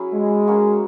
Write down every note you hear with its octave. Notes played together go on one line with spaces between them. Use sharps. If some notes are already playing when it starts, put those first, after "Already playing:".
Already playing: F#3 C#4 E4 G#4
G#3
A#3 C#4 F#4